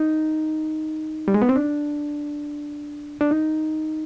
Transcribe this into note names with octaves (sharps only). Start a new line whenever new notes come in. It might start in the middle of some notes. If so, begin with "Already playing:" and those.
Already playing: D#4
G3
G#3
B3
C4
D4
D4
D#4